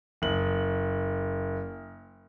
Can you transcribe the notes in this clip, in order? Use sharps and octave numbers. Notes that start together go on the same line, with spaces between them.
F#1 F#7